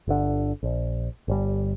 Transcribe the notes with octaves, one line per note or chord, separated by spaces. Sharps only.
G1 D3
A#1
G1 G3